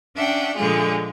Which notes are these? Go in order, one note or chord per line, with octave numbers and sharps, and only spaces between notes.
C#4 D4 E5 F#5 G5
A#2 D3 F3 G#3 F4 G#4